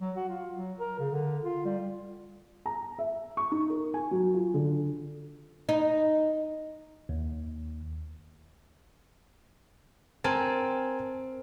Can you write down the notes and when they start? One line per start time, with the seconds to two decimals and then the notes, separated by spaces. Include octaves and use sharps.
0.01 F#3
0.16 F#4
0.28 F4
0.57 F#3
0.79 A#4
0.99 C#3
1.11 D3
1.43 F4
1.65 G3
2.66 A#5
2.99 E5
3.37 C#6
3.52 D#4
3.70 A#4
3.94 G#5
4.11 F#3
4.34 F4
4.54 D3
5.69 D#4
7.09 D#2
10.24 C4 A#4 G#5 A5